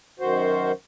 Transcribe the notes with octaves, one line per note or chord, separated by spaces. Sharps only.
F#2 D#3 F#4 C5